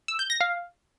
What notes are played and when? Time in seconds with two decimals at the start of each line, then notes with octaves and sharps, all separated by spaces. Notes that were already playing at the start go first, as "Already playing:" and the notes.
0.08 E6
0.19 G6
0.30 A#6
0.41 F5